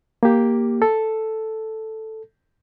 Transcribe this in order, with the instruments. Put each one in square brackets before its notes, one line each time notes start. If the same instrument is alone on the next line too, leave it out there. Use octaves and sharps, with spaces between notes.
[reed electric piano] A#3 G4
A4